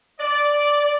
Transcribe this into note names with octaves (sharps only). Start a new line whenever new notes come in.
D5